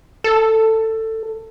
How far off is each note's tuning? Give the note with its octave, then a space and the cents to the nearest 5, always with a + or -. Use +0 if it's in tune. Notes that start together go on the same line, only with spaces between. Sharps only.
A4 +15